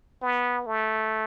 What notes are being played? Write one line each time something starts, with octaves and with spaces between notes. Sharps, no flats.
B3
A3